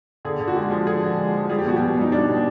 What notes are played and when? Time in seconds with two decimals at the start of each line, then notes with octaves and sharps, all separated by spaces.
0.25 D3 G#4
0.40 D3
0.48 F#4
0.56 G#3 G4
0.71 F3
0.87 D3 G#4
1.04 D3
1.18 G#3
1.34 F3
1.50 G3 G#4
1.59 G4
1.65 B2 F#4
1.76 B2 G4
1.97 G3 D#4
2.12 G3 D4
2.29 B2